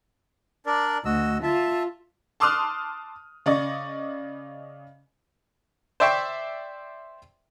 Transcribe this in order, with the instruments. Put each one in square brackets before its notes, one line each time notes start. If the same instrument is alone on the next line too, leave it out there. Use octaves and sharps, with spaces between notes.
[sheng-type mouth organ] D4 A#4 D5
[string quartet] D2 [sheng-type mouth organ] F#4 D#5 E6
[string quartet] F4 [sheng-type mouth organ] E5 A5
[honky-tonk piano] A5 C6 D6 D#6 F6 F#6
C#3 D5 D#5 C#6
[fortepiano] C5 D5 E5 G5 C#6